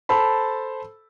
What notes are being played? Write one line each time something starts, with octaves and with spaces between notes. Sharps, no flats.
A4 C5 A5 B5